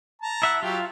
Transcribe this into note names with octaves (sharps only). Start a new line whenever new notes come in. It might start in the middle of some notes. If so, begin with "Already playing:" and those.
A5 A#5
E4 E5 F#5
F#3 F4 G4